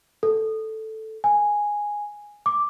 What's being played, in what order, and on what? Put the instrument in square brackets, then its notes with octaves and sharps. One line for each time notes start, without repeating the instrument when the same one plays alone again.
[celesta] A4
G#5
D6